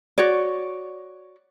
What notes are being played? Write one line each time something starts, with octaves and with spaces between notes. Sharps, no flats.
F#4 C#5 D5